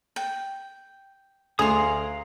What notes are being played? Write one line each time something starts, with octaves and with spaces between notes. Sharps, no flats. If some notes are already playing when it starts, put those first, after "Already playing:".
G5
D2 G#4 F5 A#5 C6 D#6